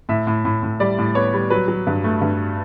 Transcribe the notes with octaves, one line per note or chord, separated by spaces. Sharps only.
A2 E5
A2
A2
A2
G3 D5
A2
B3 C#5
G3
F#3 B4
F#3
G2
A3
G2